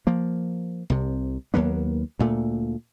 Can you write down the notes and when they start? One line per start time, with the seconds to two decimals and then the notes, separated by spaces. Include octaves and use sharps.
0.07 F3 A#3
0.90 C2 C3
1.54 D#2 F#3 A#3 B3
2.19 D2 A#2 A3